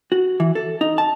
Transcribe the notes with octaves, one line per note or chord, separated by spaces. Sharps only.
F#4
E3
A4
D#4
A5